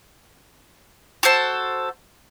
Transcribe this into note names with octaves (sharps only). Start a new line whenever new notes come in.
F#4 A4 C5 A5